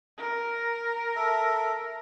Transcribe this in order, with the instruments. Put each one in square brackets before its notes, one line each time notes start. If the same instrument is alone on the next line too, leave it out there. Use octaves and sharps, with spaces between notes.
[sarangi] A#4
[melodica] A4 E5